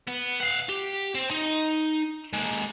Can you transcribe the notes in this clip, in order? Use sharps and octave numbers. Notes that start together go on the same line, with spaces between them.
B3
F5 F#5
G4
C4
D#4
G#3 A#3